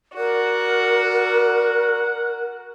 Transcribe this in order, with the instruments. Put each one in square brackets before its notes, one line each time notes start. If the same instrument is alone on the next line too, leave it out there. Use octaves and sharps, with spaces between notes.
[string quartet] F#4 [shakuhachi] A#4 [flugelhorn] D5 [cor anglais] F#5